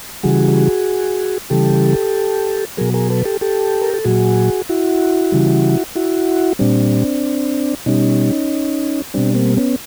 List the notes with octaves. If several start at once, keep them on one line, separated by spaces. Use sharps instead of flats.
C#3 E3 G3 F#4 G#4
C#3 E3 G3 G4 A4
B2 F#3 G#4 A#4
G#4 A#4
A4 B4
G4 A4
G4 A4
A#4
A4
A#2 F#3 F#4 G#4
E4 F#4
C#3 E3 G3
E4 F#4
A#2 G3 C4 D4
B2 G3 C#4 D#4
B2 G3 C4 D4
A#3 C4
B3 C#4